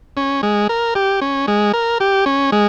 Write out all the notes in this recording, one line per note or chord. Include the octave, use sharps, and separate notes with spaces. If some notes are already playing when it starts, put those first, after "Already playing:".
C#4
G#3
A#4
G4
C#4
G#3
A#4
G4
C#4
G#3